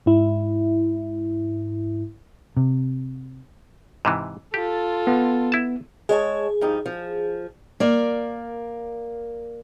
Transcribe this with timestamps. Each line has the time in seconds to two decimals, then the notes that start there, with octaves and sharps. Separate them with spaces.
0.06 G#2 E4
2.57 C3
4.05 G#2 C3 E3
4.54 F4 G4 A4
5.07 B3
5.52 E4 A5
6.09 G#3 G#4 C#5 A5
6.61 G2 F3 D#4
6.86 F3
7.80 A#3 A#4 D5